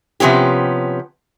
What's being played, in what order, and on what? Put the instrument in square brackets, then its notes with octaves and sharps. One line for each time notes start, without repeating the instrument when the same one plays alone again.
[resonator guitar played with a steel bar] C3 F3 B3 C#4 G4